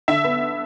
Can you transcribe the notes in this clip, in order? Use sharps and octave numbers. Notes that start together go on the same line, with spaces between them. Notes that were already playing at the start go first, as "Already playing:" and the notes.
D3 E5
B3